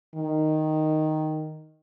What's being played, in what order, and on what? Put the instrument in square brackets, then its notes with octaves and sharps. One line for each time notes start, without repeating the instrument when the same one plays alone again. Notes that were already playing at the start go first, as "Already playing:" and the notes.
[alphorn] D#3